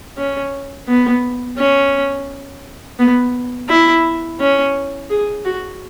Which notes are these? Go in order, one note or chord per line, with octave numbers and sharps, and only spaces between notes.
C#4
B3
C#4
B3
E4
C#4
G#4
F#4